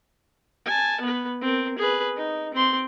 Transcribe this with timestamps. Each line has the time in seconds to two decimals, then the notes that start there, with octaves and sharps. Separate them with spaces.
0.66 G#5 A5
1.01 B3 B4
1.42 C4 A#4
1.79 G#4 B4
2.17 D#4
2.54 C4 C6